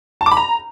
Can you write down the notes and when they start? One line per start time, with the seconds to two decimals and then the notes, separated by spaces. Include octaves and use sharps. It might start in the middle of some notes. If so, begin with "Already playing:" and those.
0.21 A5
0.26 D6
0.31 B5
0.37 A#5